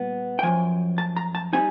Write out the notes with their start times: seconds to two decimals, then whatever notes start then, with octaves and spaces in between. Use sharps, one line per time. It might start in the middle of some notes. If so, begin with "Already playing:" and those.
Already playing: A#2 G3 B3
0.39 G5
0.43 F#2 C#3 F3 G#5
0.98 A5
1.16 A#5
1.35 A5
1.53 G3 C4 D#4 G#5